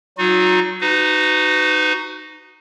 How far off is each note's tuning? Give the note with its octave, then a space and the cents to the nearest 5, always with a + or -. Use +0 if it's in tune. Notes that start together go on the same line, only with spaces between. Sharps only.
F#3 +20 D#4 +0 F#4 -45
D#4 -10 F#4 +5 B4 +35